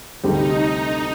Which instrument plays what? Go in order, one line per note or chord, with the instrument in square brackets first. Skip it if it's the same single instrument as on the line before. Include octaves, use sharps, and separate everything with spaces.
[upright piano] D2 C3 G3 C4 G4 [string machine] D#4